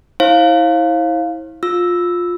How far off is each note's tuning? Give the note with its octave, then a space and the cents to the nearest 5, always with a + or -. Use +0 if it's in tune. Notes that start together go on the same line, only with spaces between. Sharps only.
E4 -30 C5 +45 F5 +0
F4 +15 E6 -5